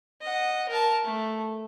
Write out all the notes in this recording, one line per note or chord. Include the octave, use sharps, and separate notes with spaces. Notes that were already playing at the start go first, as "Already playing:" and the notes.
D#5 F#5
A#4 A5
A3